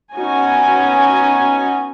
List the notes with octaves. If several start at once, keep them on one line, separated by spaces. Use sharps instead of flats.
B3 C#4 D#4 F#4 G#5